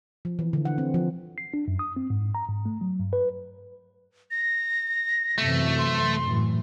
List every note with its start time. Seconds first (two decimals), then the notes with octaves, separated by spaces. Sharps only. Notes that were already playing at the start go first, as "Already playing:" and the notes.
0.25 F3
0.39 E3
0.53 D3
0.65 F#5
0.78 C4
0.94 F3
1.38 C7
1.54 D4
1.68 F#2
1.79 D#6
1.96 C4
2.10 G#2
2.35 A#5
2.48 G#2
2.66 A3
2.81 F#3
3.00 G2
3.13 B4
4.31 A#6
5.38 F#2 C3 E3 A3
5.78 C6
6.26 F#2 A2 E3